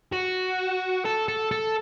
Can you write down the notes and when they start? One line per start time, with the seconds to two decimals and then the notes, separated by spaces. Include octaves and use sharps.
0.12 F#4
1.05 A4
1.28 A4
1.51 A4